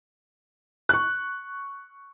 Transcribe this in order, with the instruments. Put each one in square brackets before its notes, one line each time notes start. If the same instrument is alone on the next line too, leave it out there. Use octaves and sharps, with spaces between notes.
[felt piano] C#6 F#6